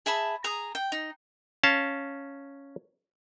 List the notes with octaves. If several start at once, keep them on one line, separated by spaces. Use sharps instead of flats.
G#4 E5 A5 B5
G#4 A#5 D#6
G5
D#4
C#4 F5 A5